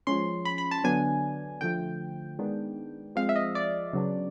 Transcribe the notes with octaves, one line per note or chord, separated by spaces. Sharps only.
F3 G#3 C#4 C6
B5
B5
A5
D3 F#3 B3 D4 G#5
D3 F3 A3 G5
D#3 G#3 B3 D4
F3 G#3 C4 F5
E5
D#5
D5
C#3 F#3 B3 D4